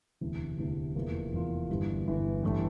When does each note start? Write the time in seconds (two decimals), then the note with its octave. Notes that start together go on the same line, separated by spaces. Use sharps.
0.21 E1 D2 C3 E3
0.58 E1 D2 C3 E3
0.95 F1 E2 E3 A#3 F4
1.33 F1 E2 E3 A#3 F4
1.69 G1 G2 E3 G3
2.06 G1 G2 E3 G3
2.43 A1 G2 E3 A3